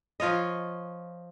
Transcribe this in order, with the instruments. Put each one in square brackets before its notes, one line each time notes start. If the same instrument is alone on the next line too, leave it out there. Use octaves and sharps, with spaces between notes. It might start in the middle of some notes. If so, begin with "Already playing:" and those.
[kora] F3 F4 C#5 D#5